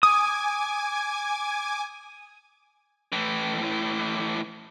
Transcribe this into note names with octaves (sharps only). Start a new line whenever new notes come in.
G#5 D6 D#6 G#6
A2 E3